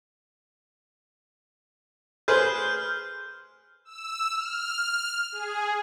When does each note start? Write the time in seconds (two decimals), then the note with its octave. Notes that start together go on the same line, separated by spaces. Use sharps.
2.28 G#4 B4 C5 F6 G6
3.85 E6
4.32 F6
5.32 G#4